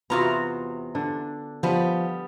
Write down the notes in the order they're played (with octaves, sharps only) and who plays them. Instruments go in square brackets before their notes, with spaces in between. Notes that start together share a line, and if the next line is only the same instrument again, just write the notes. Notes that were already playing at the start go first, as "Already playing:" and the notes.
[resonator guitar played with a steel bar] E2 C3 A#5 [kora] B3 F4 F#4
[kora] D3 D4
[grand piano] F3 [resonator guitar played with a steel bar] G3 B3